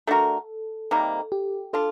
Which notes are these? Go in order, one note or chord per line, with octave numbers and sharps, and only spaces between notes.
A3 D4 F#4 A4 A#4
C3 D#3 G3 A#3
G4
D4 F4 A4